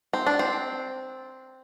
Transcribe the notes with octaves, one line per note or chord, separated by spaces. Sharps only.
C4
D4
C4